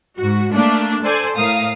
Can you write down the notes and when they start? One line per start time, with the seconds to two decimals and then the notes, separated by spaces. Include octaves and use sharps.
0.17 G#2 F#4
0.51 A3 A#3 D4
1.02 A4 C5 D5 G#5
1.37 A2 A#4 F5 D#6